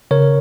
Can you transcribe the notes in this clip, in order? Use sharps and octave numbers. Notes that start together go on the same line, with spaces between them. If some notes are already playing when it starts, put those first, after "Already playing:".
C#3 A#4 C#5